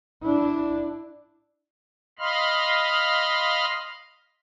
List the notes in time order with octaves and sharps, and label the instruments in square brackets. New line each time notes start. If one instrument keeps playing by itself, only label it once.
[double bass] D4 E4
[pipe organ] D#5 F5 B5 C6 F6